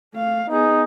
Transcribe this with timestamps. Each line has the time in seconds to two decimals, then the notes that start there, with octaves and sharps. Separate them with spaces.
0.13 A3 F5
0.50 B3 D#4 G#4